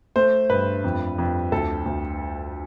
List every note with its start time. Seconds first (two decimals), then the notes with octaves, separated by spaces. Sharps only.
0.16 A3 C5
0.50 G2 B4
0.84 F2
1.18 F2
1.52 D2 A4
1.86 D2